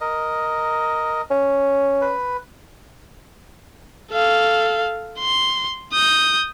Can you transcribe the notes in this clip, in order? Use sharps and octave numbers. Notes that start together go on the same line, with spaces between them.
A#4 D#5
C#4
B4
A4 F5
C6
D#6 G6